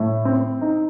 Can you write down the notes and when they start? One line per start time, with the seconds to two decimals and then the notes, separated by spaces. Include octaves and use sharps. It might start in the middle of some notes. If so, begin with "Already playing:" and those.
Already playing: A2
0.25 C4
0.61 D#4